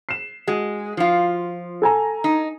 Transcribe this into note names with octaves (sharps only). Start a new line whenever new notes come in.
C7 E7
G#3 F#4
F3 F4
A4 G#5 A#5
D#4